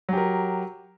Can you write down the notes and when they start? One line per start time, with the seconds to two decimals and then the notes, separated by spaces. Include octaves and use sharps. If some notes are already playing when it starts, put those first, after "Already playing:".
0.09 F#3
0.13 G4
0.17 A#4